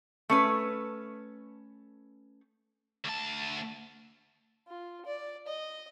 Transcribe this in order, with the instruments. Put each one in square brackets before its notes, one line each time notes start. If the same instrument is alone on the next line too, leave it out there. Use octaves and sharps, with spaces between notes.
[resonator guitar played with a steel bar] A3 C#4 B4
[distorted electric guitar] D2 A5
[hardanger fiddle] F4
D5
D#5